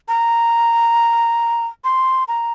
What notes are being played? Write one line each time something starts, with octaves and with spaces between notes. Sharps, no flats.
A#5
C6
A#5